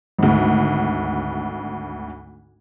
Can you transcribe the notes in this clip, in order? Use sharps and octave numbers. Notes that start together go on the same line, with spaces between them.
G#1 D2